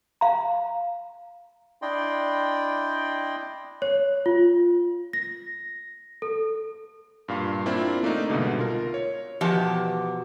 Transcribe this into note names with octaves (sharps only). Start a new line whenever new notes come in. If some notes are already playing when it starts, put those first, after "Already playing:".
F5 A#5
D4 E4 D5 D#5 G5 C6
C#5
F4
A#6
A4
G2 A#2 F5
A#3 C4 D4 E4 F4
A3 A#3 D4 D#4
C2 G#2 B2 D3
F4 A#4
C#5
E2 B2 F3 G4 D#5 A5